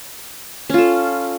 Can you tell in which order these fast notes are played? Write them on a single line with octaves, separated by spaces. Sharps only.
C#4 F4 A4